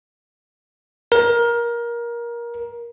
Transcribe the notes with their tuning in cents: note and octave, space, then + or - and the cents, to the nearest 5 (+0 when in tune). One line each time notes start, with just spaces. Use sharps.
A#4 +20